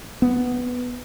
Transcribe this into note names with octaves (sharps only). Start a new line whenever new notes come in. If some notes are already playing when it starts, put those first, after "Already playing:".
B3